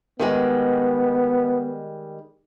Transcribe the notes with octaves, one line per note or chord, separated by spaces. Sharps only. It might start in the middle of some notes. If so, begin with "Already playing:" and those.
D#3 G3 G#3 B3